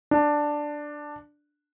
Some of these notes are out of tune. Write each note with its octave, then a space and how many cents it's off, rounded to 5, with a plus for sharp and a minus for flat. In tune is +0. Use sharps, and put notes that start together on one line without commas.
D4 +5